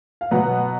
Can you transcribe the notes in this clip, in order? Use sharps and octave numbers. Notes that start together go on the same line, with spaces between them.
F5
B2 F#3 B3 F#5